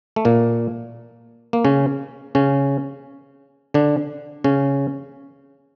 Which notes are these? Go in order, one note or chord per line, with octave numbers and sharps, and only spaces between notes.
A3
A#2 A#3
A#3
C#3 C#4
C#3 C#4
D3 D4
C#3 C#4